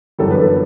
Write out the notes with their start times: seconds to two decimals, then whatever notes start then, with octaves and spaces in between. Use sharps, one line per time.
0.18 G1 F#2 E3 G3 A4
0.31 B4
0.41 A4